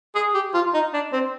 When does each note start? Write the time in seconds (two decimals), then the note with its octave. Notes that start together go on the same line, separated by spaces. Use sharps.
0.15 G#4
0.34 G4
0.54 F4
0.74 D#4
0.94 D4
1.13 C4